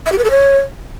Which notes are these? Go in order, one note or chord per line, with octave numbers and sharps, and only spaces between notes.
E5
G4
B4
A4
C#5